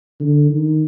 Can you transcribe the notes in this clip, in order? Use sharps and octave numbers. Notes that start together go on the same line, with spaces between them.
D3
D#3